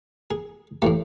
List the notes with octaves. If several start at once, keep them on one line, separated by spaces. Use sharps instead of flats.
G#4
A2 E3 A3 G4